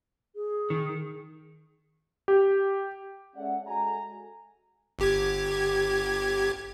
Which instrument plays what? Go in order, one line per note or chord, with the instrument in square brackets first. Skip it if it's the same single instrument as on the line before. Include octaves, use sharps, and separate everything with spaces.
[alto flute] G#4
[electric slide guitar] D#3
[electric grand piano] G4
[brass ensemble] G#3 C#4 A4 D5 E5 F#5
G#3 F#4 A4 G#5 A#5
[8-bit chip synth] G1 G4 G#6